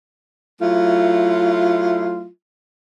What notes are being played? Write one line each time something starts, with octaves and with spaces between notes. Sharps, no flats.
F#3 A3 E4 F4